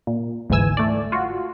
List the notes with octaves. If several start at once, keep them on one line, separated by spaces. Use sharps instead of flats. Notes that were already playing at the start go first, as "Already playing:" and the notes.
A#2
G1 D2 G#2 E3 G#5 E6
A3 D5
F4 F#4